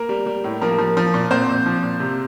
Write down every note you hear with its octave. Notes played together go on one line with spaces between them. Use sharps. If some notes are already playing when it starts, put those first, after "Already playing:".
Already playing: A#3 A#4
G3
G3
A2
F3 A#3 A#4
F3
F3
A#2
A#2 C4 C5
A#2
F3
A#2
C3